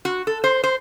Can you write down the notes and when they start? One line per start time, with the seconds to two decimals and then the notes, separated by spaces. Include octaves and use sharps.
0.05 F#4
0.27 A4
0.44 C5
0.64 C5